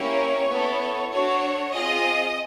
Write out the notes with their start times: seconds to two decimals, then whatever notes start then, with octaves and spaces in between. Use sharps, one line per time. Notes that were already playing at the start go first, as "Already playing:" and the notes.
Already playing: A#3 C#4 E4 G4 C#5
0.49 B3 E4 A4
1.10 D4 F#4 A4 C#5
1.71 C4 F4 G#4 D#5